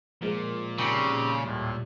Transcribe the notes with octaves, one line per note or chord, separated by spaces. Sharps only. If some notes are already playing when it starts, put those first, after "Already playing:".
A#2 F3 G#3 A#3
C#3 C4 D#4 G4
D#2 A2 G3